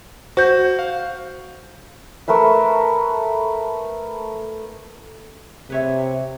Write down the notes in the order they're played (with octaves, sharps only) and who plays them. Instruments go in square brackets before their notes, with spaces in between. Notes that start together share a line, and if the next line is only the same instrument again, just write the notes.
[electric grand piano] F#4 [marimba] C5 G6
[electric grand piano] F5
[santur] A3 A#4 B4 E5
[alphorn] C3 [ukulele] B4 C#5 E5